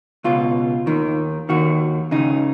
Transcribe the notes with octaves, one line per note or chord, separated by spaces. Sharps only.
C#2 B2 F4
D#2 D#3
D#2 D#3 F#4
C#2 C#3 D#4